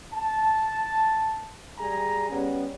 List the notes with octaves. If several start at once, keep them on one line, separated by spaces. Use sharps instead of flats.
A5
G3 G#4 G#5 A#5
G3 B3 C#4